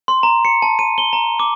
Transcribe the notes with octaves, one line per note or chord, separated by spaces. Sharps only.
C6
A#5
C#7
A5
D#7
G7
A#5
D6